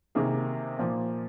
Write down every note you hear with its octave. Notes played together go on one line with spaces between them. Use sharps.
C3 D#3 A#3 G#4
A#2 F3 A#3